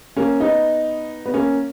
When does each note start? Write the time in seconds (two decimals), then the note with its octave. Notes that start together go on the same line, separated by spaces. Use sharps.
0.17 A#3 C#4
0.40 B3 D#4
1.26 B3
1.34 A#3 C#4